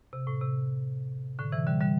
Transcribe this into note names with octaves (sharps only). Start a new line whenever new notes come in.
C3
A2
C3
A2 D3
C3 E3
D3 G3
D3 G3